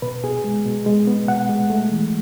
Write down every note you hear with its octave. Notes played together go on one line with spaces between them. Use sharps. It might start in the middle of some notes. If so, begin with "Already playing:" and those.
B2 B4
B2 G#4
G#3
B2
G#3
B3
B2 F#5
G#3
A3
E3